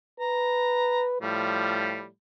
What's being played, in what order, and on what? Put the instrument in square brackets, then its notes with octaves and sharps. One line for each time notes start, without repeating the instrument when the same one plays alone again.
[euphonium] B4 [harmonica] A#5
[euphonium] A2 [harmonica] F3 G3